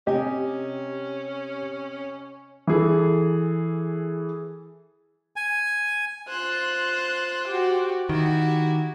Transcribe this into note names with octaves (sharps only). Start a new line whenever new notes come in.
C3 C#4 G4 D#5 G#5
E3 G#4 A4
G#5
F4 C5 F#6
F#4 G4
D#3 E4 F#4 G4